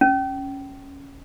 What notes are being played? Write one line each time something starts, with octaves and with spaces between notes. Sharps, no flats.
C#4